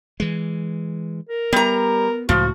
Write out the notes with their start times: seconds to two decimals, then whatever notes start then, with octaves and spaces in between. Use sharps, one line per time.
0.20 E3 G#3
1.29 A#4
1.53 G3 B3 A#5
2.29 C#2 A2 F3 F#4